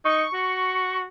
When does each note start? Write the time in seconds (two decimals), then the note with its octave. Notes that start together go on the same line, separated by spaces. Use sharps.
0.05 D#4 C#6
0.34 F#4